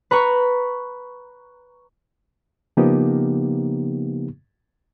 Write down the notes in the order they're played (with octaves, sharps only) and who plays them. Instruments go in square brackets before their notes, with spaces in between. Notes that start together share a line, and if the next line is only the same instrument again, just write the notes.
[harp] B4 A#5 B5 C#6
[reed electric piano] C#3 F3 A#3 B3 D#4 G4